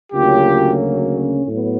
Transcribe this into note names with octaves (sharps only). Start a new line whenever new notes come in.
D2 C#3 F#3 A#3 C#4 F4 G4
A2 F#3 B3